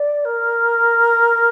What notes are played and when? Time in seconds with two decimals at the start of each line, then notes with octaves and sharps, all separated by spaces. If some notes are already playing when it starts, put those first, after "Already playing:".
Already playing: D5
0.25 A#4